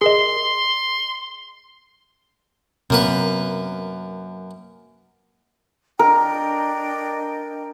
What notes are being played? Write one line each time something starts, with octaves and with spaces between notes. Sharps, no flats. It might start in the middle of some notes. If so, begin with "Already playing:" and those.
G#4 A#4 D#5 C6
F#2 C3 A#3 B3 B4
D4 A#4 D#5 G5